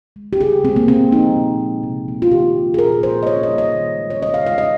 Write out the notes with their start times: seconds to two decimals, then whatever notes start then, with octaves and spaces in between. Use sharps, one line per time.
0.16 G#3
0.33 G4
0.41 C#3 G#4
0.64 G#3 C4
0.76 A#3
0.88 C#3 C4
1.11 F3 A#3 D#4
1.36 A#2
1.59 G#3
1.83 C3
2.08 F3 A#3
2.22 F4
2.32 D#3 G4
2.56 A#3
2.74 G#4
2.78 A#2 A#4
3.03 F3 A#3 C5
3.23 D#5
3.27 C#3 C#5
3.43 D#5
3.50 G3 A#3
3.58 D#5
3.75 D#3
3.98 G#3
4.10 C#5
4.22 C#3 D#5
4.34 F5
4.46 G#3 F5
4.58 D#5